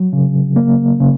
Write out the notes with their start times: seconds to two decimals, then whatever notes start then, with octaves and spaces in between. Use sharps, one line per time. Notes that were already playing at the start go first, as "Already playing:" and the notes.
Already playing: F#3
0.13 C#3
0.56 A#3
1.00 C#3